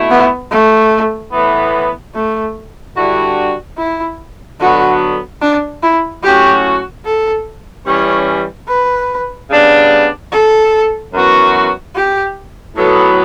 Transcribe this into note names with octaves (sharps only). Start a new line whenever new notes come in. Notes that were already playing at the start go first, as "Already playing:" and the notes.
Already playing: B2 A3 E4
B3
A3
A2 E3 B3
A3
D3 G3 D4 E4 F#4
E4
D3 F#3 B3 F#4
D4
E4
A2 F#3 C#4 F#4 G4
A4
E3 G3 C#4 C#5
B4
C#3 G3 B3 D4
A4
F#2 E3 B3 F#4
G4
A2 F#3 B3 A4